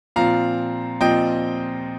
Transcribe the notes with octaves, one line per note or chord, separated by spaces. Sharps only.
A#2 F3 C4 F5 A#5
A#2 F3 C4 D#5 G5